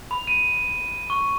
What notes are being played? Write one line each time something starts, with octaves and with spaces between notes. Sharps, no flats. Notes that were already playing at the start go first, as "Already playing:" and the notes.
B5
D#7
C#6